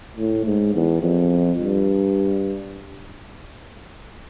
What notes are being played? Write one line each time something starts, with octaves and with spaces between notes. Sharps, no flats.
A2
G#2
E2
F2
G2